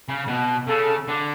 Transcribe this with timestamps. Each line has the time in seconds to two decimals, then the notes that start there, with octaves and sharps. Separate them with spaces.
0.08 C#3
0.28 B2
0.67 C#3 A4
1.08 D3